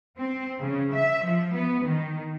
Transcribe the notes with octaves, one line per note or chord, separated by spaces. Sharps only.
C4
C#3
E5
F3
B3
D#3